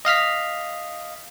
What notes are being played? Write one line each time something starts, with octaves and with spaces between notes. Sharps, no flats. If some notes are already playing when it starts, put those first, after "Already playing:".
D#5 F5 F6 B6